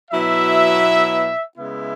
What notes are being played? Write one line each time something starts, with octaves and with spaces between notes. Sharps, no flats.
B2 F#3 B3 E4 E5
C#3 G#3 B3 E4 E5